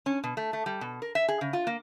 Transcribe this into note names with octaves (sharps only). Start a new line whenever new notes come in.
C#4
B2
A3
A3
G3
B2
A#4
E5
G#4
C#3
F4
A#3